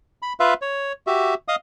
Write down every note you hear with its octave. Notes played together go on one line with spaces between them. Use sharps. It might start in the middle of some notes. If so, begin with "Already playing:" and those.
B5
F4 B4 E5 F5
C#5
F#4 G4 E5
D#5 F5 D#6